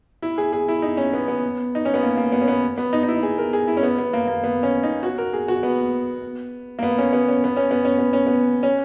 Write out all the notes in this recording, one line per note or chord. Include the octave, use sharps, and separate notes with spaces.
E4
G#4
G#4
E4
D#4
C#4
B3
B3
D#4
C#4
B3
A#3
A#3
B3
C#4
B3
B3
D#4
D#4
E4
G#4
A#4
G#4
E4
C#4
B3
B3
A#3
A#3
B3
C#4
D#4
F#4
A#4
G#4
F#4
B3
A#3
B3
C#4
B3
C#4
B3
C#4
B3
C#4
B3
C#4
B3
C#4